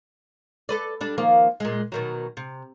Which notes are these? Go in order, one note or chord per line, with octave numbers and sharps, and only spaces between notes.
A4 B4 D5
G3 D4
D#3 F3 A#3
A#2 G#3
B2 D#3 F#3
C3